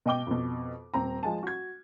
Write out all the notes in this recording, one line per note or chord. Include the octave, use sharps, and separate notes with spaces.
B2 D#5 G5 D6 G7
F2 B2
D#1 C4 A#5
F3 G#3 G#5 A5
F#4 G#6